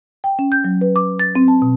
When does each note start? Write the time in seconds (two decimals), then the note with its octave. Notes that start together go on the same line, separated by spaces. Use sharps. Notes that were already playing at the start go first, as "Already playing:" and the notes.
0.24 G5
0.39 C#4
0.52 G6
0.64 F#3
0.81 B4
0.96 D6
1.20 A6
1.35 C4
1.48 A5
1.62 B2